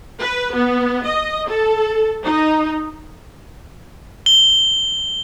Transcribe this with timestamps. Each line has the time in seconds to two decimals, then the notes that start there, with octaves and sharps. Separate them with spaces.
0.21 B4
0.55 B3
1.04 D#5
1.49 A4
2.24 D#4
4.26 G7